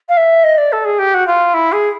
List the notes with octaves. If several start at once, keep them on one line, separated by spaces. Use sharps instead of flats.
F5
E5
D#5
D5
A4
G#4
G4
F#4
F4
E4
G#4